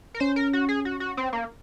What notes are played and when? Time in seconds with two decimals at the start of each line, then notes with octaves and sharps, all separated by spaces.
0.14 A#4
0.20 C#4 C5
0.36 A#4
0.53 F#4
0.69 G#4
0.85 F#4
1.00 F#4
1.17 C4
1.33 A#3